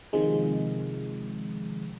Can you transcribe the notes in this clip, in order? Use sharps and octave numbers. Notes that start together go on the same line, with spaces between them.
C3 D#3 F3 G#3